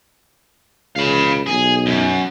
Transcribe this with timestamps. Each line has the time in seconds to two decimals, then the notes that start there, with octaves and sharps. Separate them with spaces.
0.96 C#2 F5 B5
1.46 B1 G#4
1.86 F#2